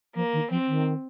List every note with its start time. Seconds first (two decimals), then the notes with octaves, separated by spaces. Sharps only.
0.15 F3 A#3
0.33 D#3
0.50 F3 C4
0.68 D#3